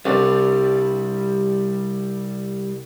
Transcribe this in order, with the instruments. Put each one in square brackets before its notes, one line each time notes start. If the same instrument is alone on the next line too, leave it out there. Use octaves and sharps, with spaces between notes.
[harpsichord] C2 [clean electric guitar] G3 B4 D5